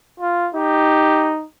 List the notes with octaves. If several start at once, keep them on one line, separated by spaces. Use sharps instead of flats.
F4
D#4 G4